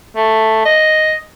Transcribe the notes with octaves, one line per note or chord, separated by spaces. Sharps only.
A3
D#5